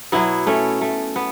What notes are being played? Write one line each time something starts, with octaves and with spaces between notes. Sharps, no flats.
B2 F#3 B3 E4
A3 C#4
A3
B3